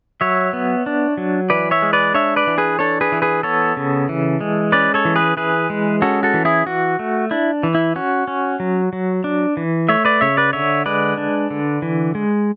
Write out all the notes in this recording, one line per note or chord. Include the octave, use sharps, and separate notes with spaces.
F#3 C#5 E5
B3
D4
F#3
E3 B4 D5
C#5 E5
G#3
B4 D5
D4 C#5 E5
B4 D5
E3
G#4 B4
D4 A4 C#5
G#4 B4
E3
G#4 B4
B3 A4 C#5
C#3
E3
G#3
C#4 B4 D5
A4 C#5
E3
G#4 B4
E3 G#4 B4
G#3
C#4 F#4 A4
F#4 A4
E3
E4 G#4
E3 F#4
A3
D4 E4
E3
E4
C#4 F#4
C#4
F#3
F#3
D4
E3
A3 C#5 E5
B4 D5
C#3 C#5 E5
B4 D5
D3 C#5 E5
G#3 B4 D5
D4
D3
E3
G#3